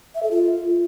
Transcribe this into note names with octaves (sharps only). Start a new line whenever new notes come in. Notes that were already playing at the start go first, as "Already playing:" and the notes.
E5
A4
F4